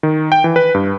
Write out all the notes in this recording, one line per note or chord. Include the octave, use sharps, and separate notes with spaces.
D#3
G5
E3
B4
G2